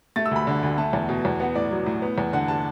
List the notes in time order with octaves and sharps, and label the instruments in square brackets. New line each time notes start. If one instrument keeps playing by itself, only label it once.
[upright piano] A3 A6
E6
D2 B5
D3
D2
A3 A5
E2
B2
E2
B3 F#5
A2 D5
F#3
A2
B3
E2
D3 F#5
A5